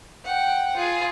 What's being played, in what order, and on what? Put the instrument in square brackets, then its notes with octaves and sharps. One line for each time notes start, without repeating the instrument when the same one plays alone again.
[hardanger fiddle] F#5 G5
F4 G#4